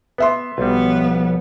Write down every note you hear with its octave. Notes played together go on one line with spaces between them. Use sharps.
B3 B4 E5 C6
B1 F3 G3 B3